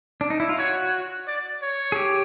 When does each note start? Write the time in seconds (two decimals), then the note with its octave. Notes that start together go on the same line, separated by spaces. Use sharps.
0.21 D4
0.30 D#4
0.40 E4
0.49 F4
0.58 F#4 C#5
1.27 D5
1.62 C#5
1.92 G#4
1.96 G4